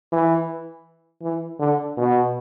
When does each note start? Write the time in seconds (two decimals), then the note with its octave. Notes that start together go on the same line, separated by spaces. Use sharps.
0.12 E3
1.23 E3
1.60 D3
1.97 B2